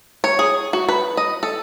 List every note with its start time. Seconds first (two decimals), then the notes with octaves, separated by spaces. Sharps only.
0.24 C#5
0.39 G#4
0.73 F#4
0.89 B4
1.17 D#5
1.43 A4